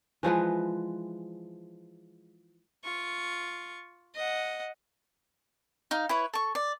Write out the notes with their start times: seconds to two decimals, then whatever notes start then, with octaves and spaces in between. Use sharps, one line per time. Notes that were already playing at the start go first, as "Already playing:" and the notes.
0.23 E3 F3 G#3 B4
2.84 F4 C#6
4.15 D#5 F#5
5.91 D#4 F5
6.09 E4 B4 C#5
6.33 A4 C#6
6.55 D5